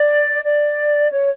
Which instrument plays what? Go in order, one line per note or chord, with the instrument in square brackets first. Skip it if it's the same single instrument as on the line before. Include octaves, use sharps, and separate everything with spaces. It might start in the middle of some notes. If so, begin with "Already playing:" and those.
Already playing: [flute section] D5
D5
C#5